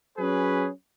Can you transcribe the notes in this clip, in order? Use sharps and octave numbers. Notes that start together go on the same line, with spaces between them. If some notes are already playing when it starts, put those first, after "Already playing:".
F#3 C#4 G#4 B4